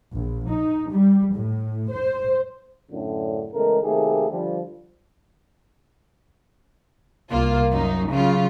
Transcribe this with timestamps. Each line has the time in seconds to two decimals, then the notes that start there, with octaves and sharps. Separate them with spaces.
0.14 A#1
0.48 D#4
0.90 G3
1.34 A2
1.92 C5
2.91 F#2 A2 D3
3.53 E2 C#3 G#3 A3 A#4
3.82 C3 D#3 A3 A#3 G4 G#4
4.30 D3 F3 G3
7.32 C2 A#3 F4
7.72 F#2 D#4
8.11 C#3 F#3 F4